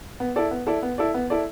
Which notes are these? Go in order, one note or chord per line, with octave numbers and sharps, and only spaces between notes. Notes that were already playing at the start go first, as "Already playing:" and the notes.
B3
E4 A4 D5
B3
E4 A4 D5
B3
E4 A4 D5
B3
E4 A4 D5